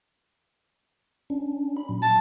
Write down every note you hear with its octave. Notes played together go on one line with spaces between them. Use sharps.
C#4 D4
B5
A#2 F#3
A5